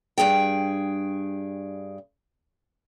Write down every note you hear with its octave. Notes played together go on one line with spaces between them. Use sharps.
G2 F#3 G#4 G5